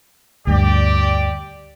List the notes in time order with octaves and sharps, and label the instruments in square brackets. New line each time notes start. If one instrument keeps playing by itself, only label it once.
[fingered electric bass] D2 G2 [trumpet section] G4 D5